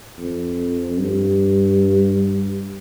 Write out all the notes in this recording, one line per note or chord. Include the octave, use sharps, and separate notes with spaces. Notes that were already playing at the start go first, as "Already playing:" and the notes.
F2
G2